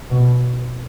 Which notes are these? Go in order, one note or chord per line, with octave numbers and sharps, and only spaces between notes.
B2